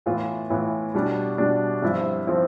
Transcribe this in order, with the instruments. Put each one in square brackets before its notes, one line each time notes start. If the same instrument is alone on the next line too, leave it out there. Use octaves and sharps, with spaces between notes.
[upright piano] A2 E3 B3 F4
A2 E3 B3 F4
B2 G3 D4
B2 G3 D4
G2 F3 C4 E4
F3 C4 E4